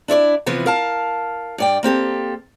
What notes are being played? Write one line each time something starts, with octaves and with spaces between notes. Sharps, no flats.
D4 E4 C#5 D5
C3 E3 F3 B3
A#4 F5 A5
G2 D5 G5
A#3 C4 G4 A4